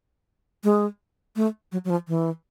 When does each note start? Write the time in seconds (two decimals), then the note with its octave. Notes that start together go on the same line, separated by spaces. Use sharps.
0.64 G#3
1.36 A3
1.72 F#3
1.85 F#3
1.90 F3
2.08 E3